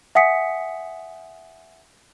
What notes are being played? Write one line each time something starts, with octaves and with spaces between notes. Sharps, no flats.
E5 F#5 G#5 D#6 B6 C#7